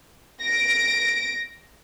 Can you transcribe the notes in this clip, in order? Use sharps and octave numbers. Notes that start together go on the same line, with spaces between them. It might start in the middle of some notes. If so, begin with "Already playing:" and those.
A#6 D7